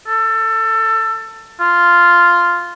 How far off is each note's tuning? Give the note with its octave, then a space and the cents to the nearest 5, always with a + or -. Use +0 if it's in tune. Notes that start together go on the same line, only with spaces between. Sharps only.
A4 +20
F4 -5